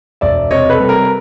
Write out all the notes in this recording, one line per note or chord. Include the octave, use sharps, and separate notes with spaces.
E1 D5 E5
C3 C#5 D#5
A4 B4
G3
A#4